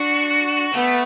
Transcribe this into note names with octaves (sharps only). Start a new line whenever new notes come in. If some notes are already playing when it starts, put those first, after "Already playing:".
Already playing: D4 F#4
A3 B3